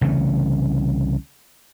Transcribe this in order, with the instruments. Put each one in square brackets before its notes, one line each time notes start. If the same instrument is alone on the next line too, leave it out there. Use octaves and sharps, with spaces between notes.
[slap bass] C2 C#3 E3 A3